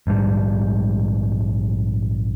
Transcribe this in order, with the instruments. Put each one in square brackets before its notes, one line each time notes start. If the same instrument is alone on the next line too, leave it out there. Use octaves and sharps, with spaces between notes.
[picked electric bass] A#1 G#2 G3